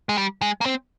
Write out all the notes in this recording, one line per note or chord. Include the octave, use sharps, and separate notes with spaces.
G#3
G3
G#3
A#3
C4